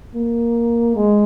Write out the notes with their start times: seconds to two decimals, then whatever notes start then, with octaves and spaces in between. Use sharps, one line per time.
0.15 A#3
0.95 G#3